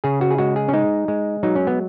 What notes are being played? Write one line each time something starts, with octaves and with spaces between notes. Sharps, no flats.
C#3 G#4
F#4
G#4
G#3 F#4
G#4
C#4
G#3 D#4
G#3
F#3 D#4
C#4
B3